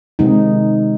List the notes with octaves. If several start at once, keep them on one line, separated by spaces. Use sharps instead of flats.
C3 D#3 G#3 C4 D#4